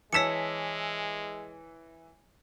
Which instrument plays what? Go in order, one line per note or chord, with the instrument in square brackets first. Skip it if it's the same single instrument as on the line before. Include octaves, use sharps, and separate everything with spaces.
[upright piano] E3 E6 B6 [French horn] G#3 [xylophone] C#5 A5 C#7